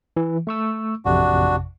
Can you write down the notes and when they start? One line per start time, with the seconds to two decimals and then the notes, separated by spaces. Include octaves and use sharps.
0.17 E3
0.47 A3 C#6 E6
1.05 A1 F2 C3 D4 F#4